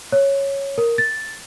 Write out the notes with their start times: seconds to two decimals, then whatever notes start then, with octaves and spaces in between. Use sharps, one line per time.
0.12 C#5
0.78 A#4
0.98 A6